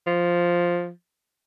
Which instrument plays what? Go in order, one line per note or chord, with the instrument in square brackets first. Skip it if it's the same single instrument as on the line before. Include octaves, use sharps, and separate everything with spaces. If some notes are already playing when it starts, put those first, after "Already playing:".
[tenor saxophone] F3